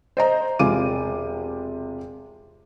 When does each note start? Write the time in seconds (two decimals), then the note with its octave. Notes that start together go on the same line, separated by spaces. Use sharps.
0.17 C5 D#5 A#5
0.59 E1 C3 F4 G#5 D6 D#7